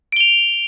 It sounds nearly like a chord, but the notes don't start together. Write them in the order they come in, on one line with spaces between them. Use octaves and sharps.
D7 G7 F7